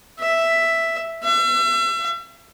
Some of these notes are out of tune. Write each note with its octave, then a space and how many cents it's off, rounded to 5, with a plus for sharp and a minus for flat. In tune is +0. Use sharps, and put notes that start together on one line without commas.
E5 +5
E5 +35